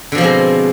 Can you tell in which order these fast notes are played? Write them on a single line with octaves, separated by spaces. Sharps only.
D3 B2 F3 C4 G#3